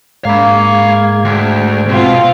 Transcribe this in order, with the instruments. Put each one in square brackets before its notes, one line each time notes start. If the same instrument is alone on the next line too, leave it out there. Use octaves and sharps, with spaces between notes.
[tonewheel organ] G#2 G#3 G#6 [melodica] A#3 [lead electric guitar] F5 B5
[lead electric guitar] D2 [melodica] G5
[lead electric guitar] B2 [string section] C4 F4